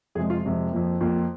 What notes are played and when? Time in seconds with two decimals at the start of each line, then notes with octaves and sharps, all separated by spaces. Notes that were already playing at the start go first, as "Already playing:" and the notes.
0.15 F2 C3 G#3 G#4
0.30 F4
0.44 F2 C3 G#3
0.72 F2 F3 A#3
1.01 F2 F3 A#3 F4